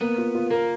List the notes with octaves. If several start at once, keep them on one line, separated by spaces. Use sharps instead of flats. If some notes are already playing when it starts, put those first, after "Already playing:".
A#3 B3
F4
F4
A#3 A#4